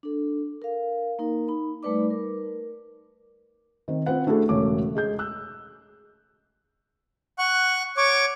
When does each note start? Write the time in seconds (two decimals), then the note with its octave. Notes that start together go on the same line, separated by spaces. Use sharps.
0.03 D4 A4
0.62 A#4 F5
1.19 A#3 D#4 A#4
1.48 D#4 B5
1.83 G3 A3 D#4 B4 D5 D6
2.10 A#4
3.88 D#3 C4
4.06 C4 F4 B4 F#5
4.27 A3 D4 E4 F#4 G#4 A4
4.49 E1 C#3 A3 C#5 D6
4.95 G#3 G#4 G6
5.19 E6 F#6
7.39 F#5 C#6 F#6
7.97 C#5 C#6 D6